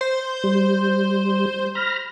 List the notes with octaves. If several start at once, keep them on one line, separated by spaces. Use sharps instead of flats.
C5
G3
B5 F6 A#6